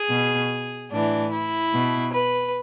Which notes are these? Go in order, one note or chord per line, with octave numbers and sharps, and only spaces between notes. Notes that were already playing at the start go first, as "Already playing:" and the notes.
Already playing: G#4
B2
A2 E3 D4
E4
B2
B4